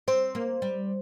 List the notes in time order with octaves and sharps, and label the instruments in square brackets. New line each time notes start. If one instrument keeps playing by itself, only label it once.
[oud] C4 [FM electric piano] C5
[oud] A#3
G3